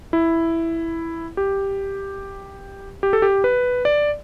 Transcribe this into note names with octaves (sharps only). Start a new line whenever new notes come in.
E4
G4
G4
A4
G4
B4
D5